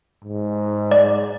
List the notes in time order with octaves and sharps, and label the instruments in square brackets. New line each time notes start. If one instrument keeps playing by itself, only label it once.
[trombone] G#2
[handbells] D5